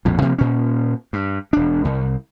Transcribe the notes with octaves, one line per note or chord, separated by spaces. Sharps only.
A#1 F2 A2
C3 F3 A#3
A#2 C#4
G2
E1 D4
C2